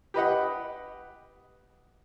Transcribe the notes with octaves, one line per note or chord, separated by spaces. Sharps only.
G4 B4 D#5 F#5